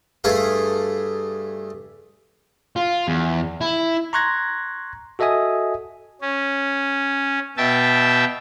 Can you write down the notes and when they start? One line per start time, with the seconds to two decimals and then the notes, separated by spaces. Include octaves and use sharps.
0.24 G2 A3 G#4 F5
2.76 F4
3.08 E2
3.61 E4
4.13 A#5 C6 C#6 F#6 G#6 A#6
5.19 F#4 A4 D#5 E5 G#5 D#6
6.21 C#4
7.57 B2 E5 G5 A5